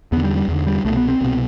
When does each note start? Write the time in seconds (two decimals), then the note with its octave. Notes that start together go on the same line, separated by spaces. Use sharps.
0.12 E2 B3
0.17 D3
0.24 G3
0.36 G3
0.48 E2 D3
0.67 G3
0.85 C2 A3
0.89 B2
0.97 B3
1.09 C4
1.21 C2 B2 C4